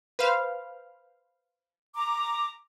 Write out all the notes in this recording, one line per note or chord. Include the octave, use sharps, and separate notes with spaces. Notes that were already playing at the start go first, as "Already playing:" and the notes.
B4 C5 F5
A#5 D6